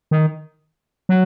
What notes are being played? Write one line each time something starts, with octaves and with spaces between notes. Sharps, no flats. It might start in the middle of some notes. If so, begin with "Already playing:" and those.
D#3
F#3